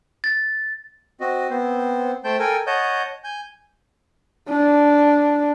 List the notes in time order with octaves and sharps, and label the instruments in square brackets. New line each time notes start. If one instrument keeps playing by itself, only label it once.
[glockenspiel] A6
[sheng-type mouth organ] C4 F#4 D#5
B3 C4 C5
A3 C5 G5 A5 G6
A4 A#4 G5 G#5
C#5 D#5 F#5 A5 D#6 G6
G#5 G6
[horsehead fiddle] D4